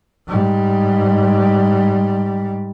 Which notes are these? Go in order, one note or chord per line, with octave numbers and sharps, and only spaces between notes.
G#2 G3